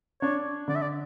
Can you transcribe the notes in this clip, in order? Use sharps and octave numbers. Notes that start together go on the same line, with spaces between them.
D4 C#5
D3 D5
E5
D5